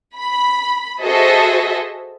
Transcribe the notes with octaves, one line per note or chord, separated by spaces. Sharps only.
B5
F#4 G#4 A4 C5 D#5 E5